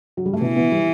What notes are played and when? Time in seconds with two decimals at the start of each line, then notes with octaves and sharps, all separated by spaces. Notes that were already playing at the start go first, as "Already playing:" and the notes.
0.17 F#3
0.26 G3
0.33 A3
0.41 B2 E3 B3
0.55 B2 B3
0.72 G3